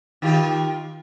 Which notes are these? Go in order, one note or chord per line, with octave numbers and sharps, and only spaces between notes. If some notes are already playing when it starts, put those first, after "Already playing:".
D#3 F4 G4